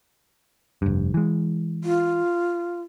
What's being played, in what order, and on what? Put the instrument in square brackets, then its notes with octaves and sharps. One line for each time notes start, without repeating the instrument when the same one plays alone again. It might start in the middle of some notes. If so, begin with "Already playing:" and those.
[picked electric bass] F1 G2
E3 G#3
[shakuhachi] F4